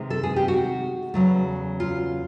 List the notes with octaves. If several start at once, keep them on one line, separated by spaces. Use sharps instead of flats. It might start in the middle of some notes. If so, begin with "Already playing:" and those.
Already playing: C3 D#3 G#3
A4
G#4
G4
F#4
E2 C#3 F#3 A3
F4